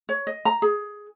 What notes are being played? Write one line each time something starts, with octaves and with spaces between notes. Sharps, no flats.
C#5
D#5
A#5
G#4